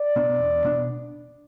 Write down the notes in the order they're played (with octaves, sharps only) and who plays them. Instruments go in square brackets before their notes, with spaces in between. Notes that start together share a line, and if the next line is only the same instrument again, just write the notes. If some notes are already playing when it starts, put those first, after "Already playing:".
Already playing: [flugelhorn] D5
[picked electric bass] B2 B3 D4
E2
B2 B3 D4